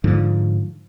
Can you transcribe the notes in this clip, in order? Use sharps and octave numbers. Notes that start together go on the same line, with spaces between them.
G#2 D3 F3